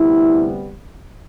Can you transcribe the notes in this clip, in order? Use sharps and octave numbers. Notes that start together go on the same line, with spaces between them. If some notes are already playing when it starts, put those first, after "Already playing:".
Already playing: D2 C3 G3 B3 E4